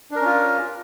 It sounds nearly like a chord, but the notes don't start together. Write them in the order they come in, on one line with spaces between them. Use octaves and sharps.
D4 A#4 C#4 F4